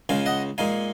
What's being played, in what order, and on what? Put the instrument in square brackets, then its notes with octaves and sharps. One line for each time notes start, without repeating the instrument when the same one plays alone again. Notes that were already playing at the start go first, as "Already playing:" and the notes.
[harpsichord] C#2 C#3 G#3 F5 G#5
D#5 F#5
A#2 G#3 D#4 F5 G#5